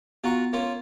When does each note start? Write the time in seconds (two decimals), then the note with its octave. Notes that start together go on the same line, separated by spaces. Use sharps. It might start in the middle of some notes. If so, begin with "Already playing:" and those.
0.24 B3 F4 F#4 F#5 A#5
0.53 A#3 C#4 F4